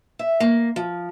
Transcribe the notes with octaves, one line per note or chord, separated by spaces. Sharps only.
E5
A#3
F3